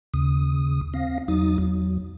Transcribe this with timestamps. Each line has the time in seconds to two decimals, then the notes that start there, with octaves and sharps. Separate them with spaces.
0.14 D#2 C#3 D#6
0.94 C4 F5 A#6
1.28 E2 F#3 D#4 D#6 A6
1.58 E2 F#3